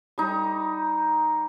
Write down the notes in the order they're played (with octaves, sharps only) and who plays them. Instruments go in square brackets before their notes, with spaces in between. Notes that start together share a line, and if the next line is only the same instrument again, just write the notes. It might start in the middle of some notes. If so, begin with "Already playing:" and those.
[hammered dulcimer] G3 D#4